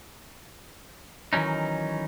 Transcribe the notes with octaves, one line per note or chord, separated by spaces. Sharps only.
D#3 E3 F#3 C#4 D#4